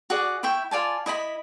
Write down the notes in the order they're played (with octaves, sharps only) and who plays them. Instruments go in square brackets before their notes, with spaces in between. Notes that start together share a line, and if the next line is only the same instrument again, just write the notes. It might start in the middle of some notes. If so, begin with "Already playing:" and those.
[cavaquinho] F#4 G#4 D5
E4 E5 G5 C#6
F4 D5 G#5 A5
E4 D#5 G#5 B5